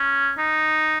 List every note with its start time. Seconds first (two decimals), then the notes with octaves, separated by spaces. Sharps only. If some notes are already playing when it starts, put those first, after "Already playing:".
Already playing: C#4
0.38 D#4